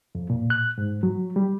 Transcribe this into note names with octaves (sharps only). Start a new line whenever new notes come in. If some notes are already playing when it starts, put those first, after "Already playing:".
F2
A#2
F#6
G#2
F#3
G3